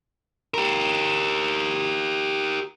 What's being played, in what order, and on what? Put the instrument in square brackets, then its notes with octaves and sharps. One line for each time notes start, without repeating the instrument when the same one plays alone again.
[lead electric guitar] G4 A#4